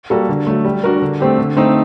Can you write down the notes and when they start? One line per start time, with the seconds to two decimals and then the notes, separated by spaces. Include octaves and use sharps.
0.10 G3 A#3 F#4 A4
0.29 D3
0.47 F#3 A3
0.65 G3
0.84 D4 F#4 A#4
1.02 D3
1.20 A3 C4 G4
1.38 D3
1.57 A3 C4 D#4